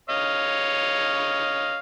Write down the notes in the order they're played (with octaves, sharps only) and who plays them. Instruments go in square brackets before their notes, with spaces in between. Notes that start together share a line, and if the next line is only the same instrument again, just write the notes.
[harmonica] C#5 D#5 F5